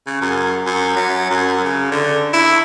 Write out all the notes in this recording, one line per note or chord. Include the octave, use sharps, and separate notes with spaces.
C#3
F#2
F#2
F#3
F#2
C#3
D3
E4